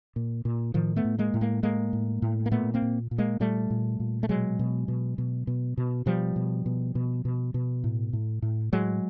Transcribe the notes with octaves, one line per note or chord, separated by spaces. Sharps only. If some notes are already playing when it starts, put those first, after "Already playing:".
A#2
A#2
A2 D#3 F3
A3 B3
A2
G#3 A#3
A2
G#3 A#3
A2 G#3 A#3
A2
A2
A#3
A#2 A3 B3
A#3 C4
A#2
A#2
G#3 A#3
A#2 G3 A3
A#2
A#2
A3
B2 F#3 G#3
B2
B2
B2
B2
B2
B2 F3 G3
B2
B2
B2
B2
B2
A2
A2
A2
A2 F#3 G#3